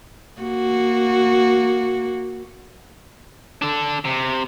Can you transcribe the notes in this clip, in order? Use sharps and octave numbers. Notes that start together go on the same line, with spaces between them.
A#3 F#4
D4 A4
C3